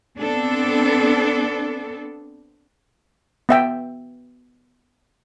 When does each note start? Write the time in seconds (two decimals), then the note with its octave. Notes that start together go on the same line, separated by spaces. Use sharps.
0.18 B3 C4 D4 A4
3.49 B3 E5 G5